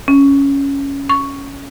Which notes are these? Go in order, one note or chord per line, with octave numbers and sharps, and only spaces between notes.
C#4
C#6